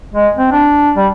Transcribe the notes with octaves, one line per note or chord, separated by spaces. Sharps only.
G#3
C4
D4
G3